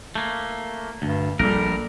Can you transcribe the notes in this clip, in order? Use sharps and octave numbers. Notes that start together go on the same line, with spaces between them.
A3 A#3
D2 G2
A#1 G3 A4 A#4